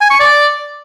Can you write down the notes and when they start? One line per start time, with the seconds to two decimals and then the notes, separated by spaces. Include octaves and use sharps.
0.01 G#5
0.10 C#6
0.19 D5